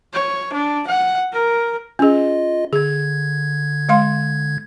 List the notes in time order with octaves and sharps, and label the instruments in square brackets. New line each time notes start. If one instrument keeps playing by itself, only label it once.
[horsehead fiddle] C#5
D4
F#5
A#4
[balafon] C#4 G#4 [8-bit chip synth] F4 D#5
[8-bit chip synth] D3 G#6 [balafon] G#4
[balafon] G#3 F5 C6